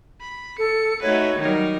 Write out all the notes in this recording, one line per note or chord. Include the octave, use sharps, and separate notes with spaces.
B5
A4 C#7
A3 D#4 F#4 B4 C#5
D#3 F#3 G3 D#4 A#4